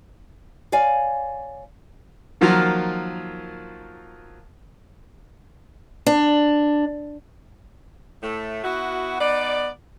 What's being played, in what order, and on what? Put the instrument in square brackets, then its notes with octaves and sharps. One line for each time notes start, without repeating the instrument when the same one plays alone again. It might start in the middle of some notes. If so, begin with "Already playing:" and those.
[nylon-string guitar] C#5 D5 F5 G#5
[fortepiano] D#3 F3 F#3 A#3 F4 A#4
[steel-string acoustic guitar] D4
[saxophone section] A2 A3
B3 E4 F#4
B3 D#4 D5